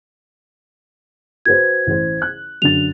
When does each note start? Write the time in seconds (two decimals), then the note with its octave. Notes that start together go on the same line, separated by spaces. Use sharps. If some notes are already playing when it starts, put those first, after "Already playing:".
1.46 F#4 B4 C5 G#6
1.87 A1 C5
2.22 F#6
2.62 F#2 D3 A6 F7